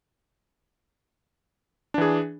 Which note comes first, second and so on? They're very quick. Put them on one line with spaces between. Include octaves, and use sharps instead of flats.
D4 E3 G#4